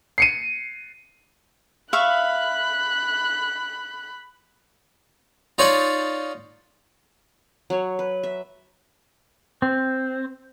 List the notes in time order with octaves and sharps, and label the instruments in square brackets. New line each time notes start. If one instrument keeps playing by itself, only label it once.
[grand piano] C7 C#7 D#7
[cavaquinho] E5 F5 C#6 [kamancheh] B5 F#6
[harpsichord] D#4 F4 C#5 D5
[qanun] F#3 C#5
B4
E5
[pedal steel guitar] C4